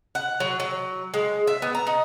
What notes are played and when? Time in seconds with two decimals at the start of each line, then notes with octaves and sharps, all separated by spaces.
0.15 F#5
0.40 F#3
0.60 F#3
1.14 G#3
1.47 E5
1.62 B3
1.75 A#5
1.87 D#4